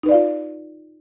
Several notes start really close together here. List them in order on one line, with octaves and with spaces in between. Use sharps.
D#4 B4 D5 F5 F4